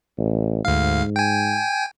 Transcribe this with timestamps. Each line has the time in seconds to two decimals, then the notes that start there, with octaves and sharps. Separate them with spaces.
0.18 A1
0.65 D2 G#2 F5
1.16 G5 G#5